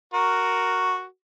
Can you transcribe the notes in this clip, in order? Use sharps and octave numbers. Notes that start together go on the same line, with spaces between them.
F#4 A#4